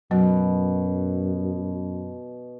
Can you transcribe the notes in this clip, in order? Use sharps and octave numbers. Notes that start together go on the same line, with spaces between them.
F#2 B2 F#3